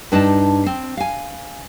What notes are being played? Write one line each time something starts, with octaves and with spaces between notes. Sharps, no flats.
G2 D4 D#4 A5
C4
F5 G#5